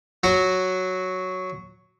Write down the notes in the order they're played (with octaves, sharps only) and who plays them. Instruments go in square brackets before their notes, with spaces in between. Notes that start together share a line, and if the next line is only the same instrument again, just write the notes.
[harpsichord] F#3 F#4